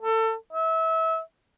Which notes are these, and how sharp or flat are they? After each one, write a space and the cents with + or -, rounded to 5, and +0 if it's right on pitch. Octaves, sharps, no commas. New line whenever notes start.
A4 +25
E5 -30